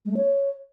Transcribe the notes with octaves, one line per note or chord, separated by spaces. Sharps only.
G#3
A3
C#5